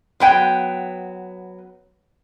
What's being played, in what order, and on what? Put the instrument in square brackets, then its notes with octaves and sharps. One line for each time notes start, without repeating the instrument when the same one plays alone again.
[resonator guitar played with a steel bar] F#3 B3 G5